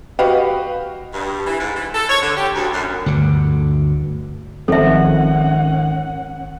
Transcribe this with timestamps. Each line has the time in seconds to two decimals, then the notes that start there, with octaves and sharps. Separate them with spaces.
0.19 F#4 G4 B4 D#5 F5
1.14 G2
1.47 E3
1.60 G#2
1.75 E3
1.94 A4
2.10 C#5
2.22 D3
2.36 G4
2.55 D2
2.73 F#2
3.06 D2 G2 D3
4.68 G#1 D#3 F3 C4 C#4 A4 E5 F#5